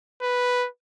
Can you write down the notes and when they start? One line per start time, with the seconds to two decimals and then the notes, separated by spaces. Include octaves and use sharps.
0.22 B4